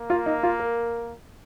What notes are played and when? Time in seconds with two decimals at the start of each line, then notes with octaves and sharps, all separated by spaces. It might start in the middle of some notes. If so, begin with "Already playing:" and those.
Already playing: A#3
0.10 F4
0.26 D#4
0.43 F4
0.60 A#4